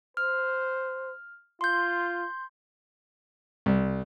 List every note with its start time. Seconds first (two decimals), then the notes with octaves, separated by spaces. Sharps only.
0.17 C5 F6
1.61 F4 C6 G6
3.66 C2